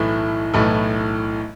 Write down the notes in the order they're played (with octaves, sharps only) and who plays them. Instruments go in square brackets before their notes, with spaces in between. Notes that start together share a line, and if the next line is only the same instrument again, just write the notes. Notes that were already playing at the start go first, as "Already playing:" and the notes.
Already playing: [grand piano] B1 A2 E3 A3 E4
B1 A2 E3 A3 E4